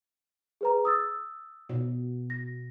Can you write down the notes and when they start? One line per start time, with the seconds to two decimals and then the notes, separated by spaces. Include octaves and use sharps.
0.61 G#4 B4 A#5
0.85 D#6 E6 A6
1.69 B2
2.30 A#6